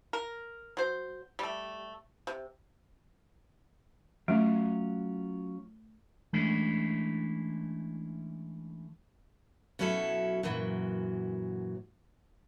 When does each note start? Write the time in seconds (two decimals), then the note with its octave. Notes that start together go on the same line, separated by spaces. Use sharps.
0.13 A#4
0.77 F#3 C5
1.39 G3 A3
2.27 C3
4.28 F#3 A3 C#4 F4
6.33 E3 G#3 A3 C#4 D4 E4
9.79 B2 F#3 C#4 E4 A4
10.43 F#2 A#2 E3 F#3